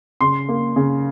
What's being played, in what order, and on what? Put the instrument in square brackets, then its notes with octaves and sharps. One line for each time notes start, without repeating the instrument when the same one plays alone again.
[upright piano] C#3 C6
A#3
C#3